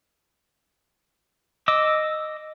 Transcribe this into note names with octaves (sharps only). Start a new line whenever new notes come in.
D#5 D6 E6